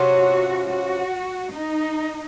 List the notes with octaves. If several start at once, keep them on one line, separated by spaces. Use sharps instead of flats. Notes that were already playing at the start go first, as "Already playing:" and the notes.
Already playing: C3 F#3 C#4 F4 F#4
F#4
D#4